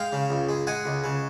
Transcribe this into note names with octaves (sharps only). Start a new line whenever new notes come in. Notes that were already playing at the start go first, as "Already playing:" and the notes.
Already playing: G#3 F5 G5
C#3
C#2
G#3
G#3 F#5 G#5
C#2
C#3